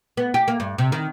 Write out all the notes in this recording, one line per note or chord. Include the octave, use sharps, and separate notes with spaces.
B3
G4
A#3
G2
C3
D#3